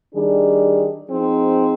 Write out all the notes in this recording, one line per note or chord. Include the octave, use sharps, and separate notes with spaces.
D#3 G3 D4 G#4
F3 C4 D#4 G#4